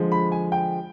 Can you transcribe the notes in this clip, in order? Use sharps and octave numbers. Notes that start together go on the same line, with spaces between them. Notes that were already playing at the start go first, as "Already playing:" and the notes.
Already playing: D3 F3 G#3
B5
G#5
G5